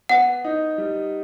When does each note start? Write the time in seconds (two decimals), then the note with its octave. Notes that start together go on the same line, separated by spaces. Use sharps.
0.09 B3 F#5
0.44 D#4
0.78 G3